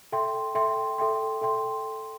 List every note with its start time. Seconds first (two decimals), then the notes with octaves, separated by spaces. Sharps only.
0.12 A4 E5 G5 C6
0.55 A4 E5 G5 C6
0.98 A4 E5 G5 C6
1.41 A4 E5 G5 C6